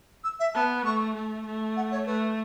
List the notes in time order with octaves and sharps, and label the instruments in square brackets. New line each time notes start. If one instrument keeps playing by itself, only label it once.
[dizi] E6
E5
[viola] B3 [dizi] A5
[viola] A3 [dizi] C#6
[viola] A3
A3
[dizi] F#5
C#5
[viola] A3 [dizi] B4